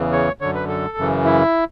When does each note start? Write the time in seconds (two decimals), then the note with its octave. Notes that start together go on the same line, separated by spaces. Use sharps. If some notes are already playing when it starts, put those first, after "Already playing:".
Already playing: E2 C#3 E3
0.12 C#5
0.41 F#2 D3 C#5
0.55 B4
0.69 A4
0.97 F#2 C#3 E3
1.25 E4